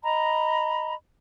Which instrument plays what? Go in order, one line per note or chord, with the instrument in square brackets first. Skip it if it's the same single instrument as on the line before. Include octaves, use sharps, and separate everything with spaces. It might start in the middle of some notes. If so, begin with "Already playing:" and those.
[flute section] D#5 A#5 B5